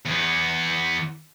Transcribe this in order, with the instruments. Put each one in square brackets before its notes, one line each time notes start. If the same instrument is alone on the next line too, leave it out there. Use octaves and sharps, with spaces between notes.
[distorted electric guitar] E2 B3